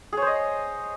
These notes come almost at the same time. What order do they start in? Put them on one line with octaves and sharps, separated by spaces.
G#4 C#5 C5 D#5